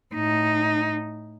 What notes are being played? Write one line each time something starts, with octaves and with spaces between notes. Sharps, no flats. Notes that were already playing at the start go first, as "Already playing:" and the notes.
A2 D#4